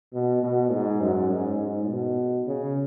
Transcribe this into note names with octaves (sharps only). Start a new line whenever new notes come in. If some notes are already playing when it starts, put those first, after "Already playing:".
B2
B2
G#2
F#2
G#2
G#2
B2
C#3